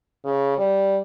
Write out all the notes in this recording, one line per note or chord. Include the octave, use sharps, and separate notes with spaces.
C#3
G3